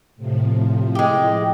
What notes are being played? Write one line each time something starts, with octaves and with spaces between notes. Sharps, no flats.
A2 C3 F3
G#3 G4